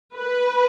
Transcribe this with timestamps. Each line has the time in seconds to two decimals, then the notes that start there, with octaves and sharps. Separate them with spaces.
0.15 B4